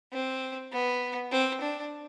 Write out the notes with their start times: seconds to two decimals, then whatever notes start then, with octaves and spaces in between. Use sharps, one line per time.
0.12 C4
0.72 B3
1.32 C4
1.61 D4